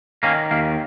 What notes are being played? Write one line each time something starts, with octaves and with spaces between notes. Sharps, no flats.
D#3 A#3 C#4
D#2 A#3